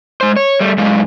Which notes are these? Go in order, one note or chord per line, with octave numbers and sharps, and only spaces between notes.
G#3 C5
C#5
G3 A3
F#2 G#3 F5